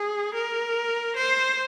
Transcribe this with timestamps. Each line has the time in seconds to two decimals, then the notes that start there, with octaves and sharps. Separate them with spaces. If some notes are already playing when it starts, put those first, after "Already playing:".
Already playing: G#4
0.35 A#4
1.16 C5